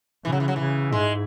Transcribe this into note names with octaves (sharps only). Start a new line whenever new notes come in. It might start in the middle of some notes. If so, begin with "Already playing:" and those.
C#3 E3
F#3
E3
F#3
C#3 E3
G#2 G#3